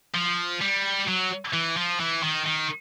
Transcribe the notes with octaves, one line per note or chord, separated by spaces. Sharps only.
F3
G3
F#3
E3
F3
E3
D#3
D#3